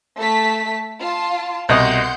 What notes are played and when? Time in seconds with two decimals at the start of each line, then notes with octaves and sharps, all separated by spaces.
0.17 A3 A5 B6
0.99 F4 A5
1.69 C2 B2 D#5 F#5 C6 G6